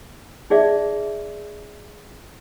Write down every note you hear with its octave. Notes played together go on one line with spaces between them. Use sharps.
D#4 G#4 D5 E5